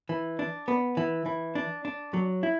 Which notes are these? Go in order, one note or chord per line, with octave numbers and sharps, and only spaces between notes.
E3
D4
B3
E3
E3
D4
D4
F#3
E4